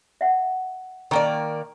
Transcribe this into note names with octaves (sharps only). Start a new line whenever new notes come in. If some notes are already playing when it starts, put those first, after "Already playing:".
E5 F#5
D#3 A#3 D5 A5 A#5 C#6